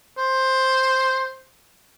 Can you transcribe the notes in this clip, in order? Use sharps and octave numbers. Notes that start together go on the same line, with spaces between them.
C5